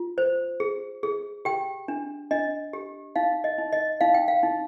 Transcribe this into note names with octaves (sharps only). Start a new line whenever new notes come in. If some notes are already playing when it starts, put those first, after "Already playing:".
Already playing: F4
C5
G#4
G#4
G4 G5
D4
D4 D#5
G4
D#4 F5
D#5
D#4
D#5
D#4 F5
G5
F5
D#4